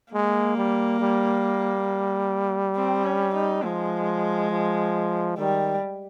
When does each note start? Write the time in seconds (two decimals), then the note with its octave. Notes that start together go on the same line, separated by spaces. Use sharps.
0.13 G#3 A#3
0.57 G3
1.00 G3
2.76 C4
3.05 C#4
3.34 D#4
3.64 F3 G#3
4.51 F3
5.38 D#3 G3